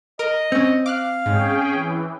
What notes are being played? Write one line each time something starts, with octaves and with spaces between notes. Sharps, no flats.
A#4 D#5 D7
C4 C#4 C#7
F5 D6 F6 F#6
G#2 C#4 G#4 G5
E3